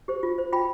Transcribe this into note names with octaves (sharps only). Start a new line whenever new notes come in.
G4 C5
F4
C5
F4 G5 B5